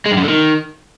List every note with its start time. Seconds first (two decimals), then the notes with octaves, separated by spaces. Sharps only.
0.06 G#3
0.11 G2
0.17 F#2
0.23 D3
0.29 D#3